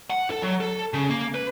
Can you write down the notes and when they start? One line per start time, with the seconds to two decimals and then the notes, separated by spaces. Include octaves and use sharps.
0.10 F#5
0.30 A4
0.42 F#3
0.60 A4
0.94 C#3
1.10 A#3
1.35 B4